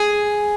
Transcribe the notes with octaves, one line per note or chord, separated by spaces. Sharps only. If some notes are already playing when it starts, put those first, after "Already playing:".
Already playing: G#4